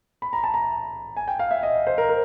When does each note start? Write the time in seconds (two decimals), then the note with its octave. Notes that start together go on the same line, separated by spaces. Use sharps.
0.22 B5
0.33 A#5
0.44 A5
0.54 A#5
1.17 G#5
1.28 G5
1.39 F5
1.51 E5
1.63 D#5
1.87 C5
1.98 A#4
2.09 A#4